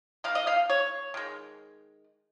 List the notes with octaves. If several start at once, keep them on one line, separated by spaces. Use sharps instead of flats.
D#3 A#3 F5
D#5
F5
C#5
D#3 G#3